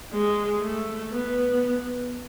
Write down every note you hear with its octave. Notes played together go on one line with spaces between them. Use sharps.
G#3
A3
B3